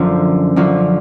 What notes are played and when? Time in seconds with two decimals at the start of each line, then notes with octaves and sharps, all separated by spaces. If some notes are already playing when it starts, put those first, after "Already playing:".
Already playing: F#2 D3 F3
0.56 F#2 D3 F3